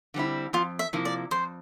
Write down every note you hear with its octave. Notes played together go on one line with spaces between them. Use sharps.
D3 G3 C4 E4
F2 F4
E5
C3 F3 A#3 E4
D5
F2 C5